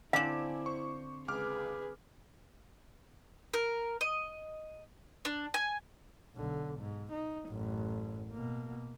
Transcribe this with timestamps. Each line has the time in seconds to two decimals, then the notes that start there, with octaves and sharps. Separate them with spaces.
0.13 D3 C4 E4 F5 G#5 D6 E7
0.66 C5 C#6
1.28 C#2 G#4 B4 D6 F6
3.53 A#4
4.01 D#5
5.25 D4
5.54 G#5
6.35 B1 D3
6.79 G#2
7.12 D#4
7.49 A1 F#2
8.32 B2 A#3